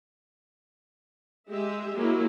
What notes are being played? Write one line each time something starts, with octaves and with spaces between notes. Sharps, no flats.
G#3 G4 E5
F#3 G#3 A#3 E4